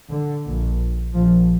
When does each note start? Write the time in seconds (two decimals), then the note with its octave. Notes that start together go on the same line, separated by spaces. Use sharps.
0.10 D3
0.45 A#1 A#2
1.14 A#1 A#2 F3